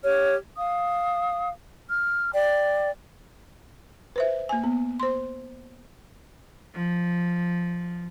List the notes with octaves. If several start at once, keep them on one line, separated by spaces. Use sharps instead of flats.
G4 C#5 F6
F5 D#6
F6
D5 G5
B4 C5 E5
A#3 G#5
B3
C5 C6
F3